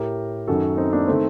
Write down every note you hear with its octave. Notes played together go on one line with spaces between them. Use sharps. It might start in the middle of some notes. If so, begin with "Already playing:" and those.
Already playing: A2 G4 A#4
F#2 D#3 F#4 A4
C4 D#4
A#3 D4
D#3 A3 C4